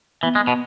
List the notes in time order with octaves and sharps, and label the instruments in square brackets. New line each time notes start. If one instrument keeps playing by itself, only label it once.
[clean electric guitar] E3 [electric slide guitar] B3
[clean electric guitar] G#3
[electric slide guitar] B3
[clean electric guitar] B2